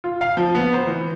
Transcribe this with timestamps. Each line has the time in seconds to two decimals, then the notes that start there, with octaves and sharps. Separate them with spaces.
0.04 F4
0.21 F5
0.37 F3
0.55 B3
0.73 C5
0.87 E3